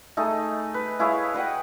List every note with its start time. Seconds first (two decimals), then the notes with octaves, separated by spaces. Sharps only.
0.17 A3 D#4 G#4 D#5
0.74 B4
1.00 E4 G#4 C#5 F5
1.34 B4 D#5 F#5 G5